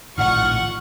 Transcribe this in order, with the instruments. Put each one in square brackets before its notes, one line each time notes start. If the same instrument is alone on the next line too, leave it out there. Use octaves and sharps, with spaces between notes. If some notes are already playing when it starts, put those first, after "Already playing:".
[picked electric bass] A#1 A2 D#3 [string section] F4 F#5 C#6 [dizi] F6